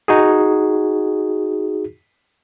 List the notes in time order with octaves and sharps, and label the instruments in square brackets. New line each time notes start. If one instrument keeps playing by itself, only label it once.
[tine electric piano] D#4 F#4 G#4